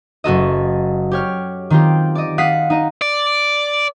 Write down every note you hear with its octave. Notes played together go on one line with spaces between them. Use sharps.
F#1 F#4 A4 D#5
G4 C#5 F6
D#3 C4 F4 G4
D5 D#5
F5 F#5 D#6 F#6 B6 C7
D#4 D#5
D5